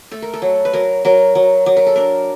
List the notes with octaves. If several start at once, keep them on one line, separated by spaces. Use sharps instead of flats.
A3 A4
A#4
A4
F#3
B4
F#3 A#4
F#3 A#4
F#3
F#3
A#4
A4
D4 A#4